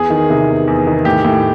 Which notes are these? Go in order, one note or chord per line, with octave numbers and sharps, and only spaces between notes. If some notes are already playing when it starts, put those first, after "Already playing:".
Already playing: E2 G#4
D#3
C3
E2
E2
D#3
A2 G4
A2